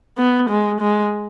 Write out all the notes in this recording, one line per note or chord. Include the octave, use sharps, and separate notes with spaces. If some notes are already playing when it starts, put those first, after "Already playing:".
B3
G#3
G#3